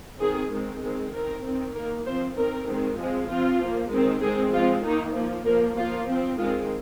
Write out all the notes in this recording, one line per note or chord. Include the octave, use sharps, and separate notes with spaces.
D#3 C4 G#4
D#3 G#3 C4
D#3 G#3 C4
D#3 C4 A#4
D#3 C4
D#3 A#3 A#4
F3 C4 C5
D#3 C4 A#4
D#3 G#3 C4
F3 G#3 C4
F3 C4 F4
F3 A#3
D#3 G#3 C4
D#3 G#3 C4 G#4
F3 G#3 C4 F4
D#3 A#3 D#4
F3 A#3
F3 A#3 A#4
F3 A#3 F4
F3 C4
D#3 G#3 C4 F4